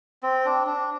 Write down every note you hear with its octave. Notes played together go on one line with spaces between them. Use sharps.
C4
D4
D4